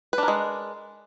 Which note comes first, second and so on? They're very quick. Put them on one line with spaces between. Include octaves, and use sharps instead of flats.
B4 D4 A#4 G#3